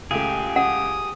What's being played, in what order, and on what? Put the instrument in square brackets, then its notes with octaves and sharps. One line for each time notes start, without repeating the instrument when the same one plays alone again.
[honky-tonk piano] C#2 A3 [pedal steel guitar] G4 G#4
[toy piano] F#5 [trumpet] D#6